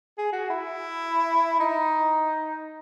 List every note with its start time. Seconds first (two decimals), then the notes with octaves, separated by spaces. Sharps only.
0.18 G#4
0.33 F#4
0.50 E4
1.60 D#4